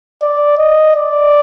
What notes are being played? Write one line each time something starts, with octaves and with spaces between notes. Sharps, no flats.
D5
D#5
D5